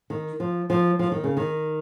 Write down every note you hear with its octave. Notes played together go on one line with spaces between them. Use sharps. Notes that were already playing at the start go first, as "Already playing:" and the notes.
D#3
F3
F3
F3
D#3
C#3
D#3